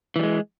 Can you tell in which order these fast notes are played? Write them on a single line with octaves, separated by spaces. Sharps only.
E3 G3 G#3